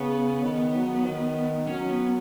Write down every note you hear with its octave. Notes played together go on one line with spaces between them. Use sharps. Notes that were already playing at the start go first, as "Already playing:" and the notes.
Already playing: C#3 B3
D#3
F#3
D#3
F#3 C#4
B3